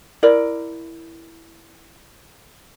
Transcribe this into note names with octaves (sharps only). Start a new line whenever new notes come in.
E4 A#4 D5